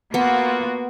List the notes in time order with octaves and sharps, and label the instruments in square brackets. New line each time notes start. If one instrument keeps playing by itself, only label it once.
[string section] A#3 F4 F#4 [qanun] B3